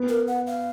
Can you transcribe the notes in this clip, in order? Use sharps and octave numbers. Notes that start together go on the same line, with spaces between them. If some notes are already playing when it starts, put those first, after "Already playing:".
Already playing: B3
A#4
F#5
F5